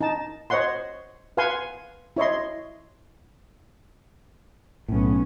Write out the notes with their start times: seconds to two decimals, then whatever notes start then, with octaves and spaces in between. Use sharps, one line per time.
0.01 D#4 A5
0.50 C5 C#5 D#5 F#5 C6
1.37 B4 F5 F#5 G#5 C6
2.16 E4 C#5 D#5 C6
4.88 B1 A2 B3 C#4